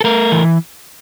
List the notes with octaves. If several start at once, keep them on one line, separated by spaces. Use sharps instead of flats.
A4
A3 A#4
E3